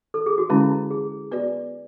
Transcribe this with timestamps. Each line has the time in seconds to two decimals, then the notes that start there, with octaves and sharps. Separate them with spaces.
0.14 A4
0.26 G#4
0.38 F#4
0.50 D3 G#3 C#4 E4
0.91 G#4
1.31 B3 F#4 B4 D5